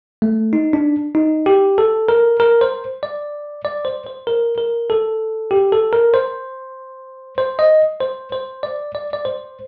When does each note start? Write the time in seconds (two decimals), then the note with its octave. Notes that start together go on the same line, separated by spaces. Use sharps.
0.22 A3
0.53 D#4
0.73 D4
1.15 D#4
1.46 G4
1.78 A4
2.09 A#4
2.40 A#4
2.61 C5
3.03 D5
3.65 D5
3.85 C5
4.06 C5
4.27 A#4
4.58 A#4
4.90 A4
5.51 G4
5.72 A4
5.93 A#4
6.14 C5
7.38 C5
7.59 D#5
8.01 C5
8.32 C5
8.63 D5
8.95 D5
9.13 D5
9.25 C5